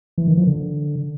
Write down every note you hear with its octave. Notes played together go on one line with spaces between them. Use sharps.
E3
D#3
F3
D3